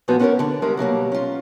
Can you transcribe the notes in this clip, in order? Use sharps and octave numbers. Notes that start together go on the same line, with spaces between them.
G2 A#2 F3 A3 B3 F#4
B3 C#4 F#4 A4 A#4 C#5
D3 D4
G3 G#3 A#4 E5
B2 F#3 G3 A#3
C#4 F4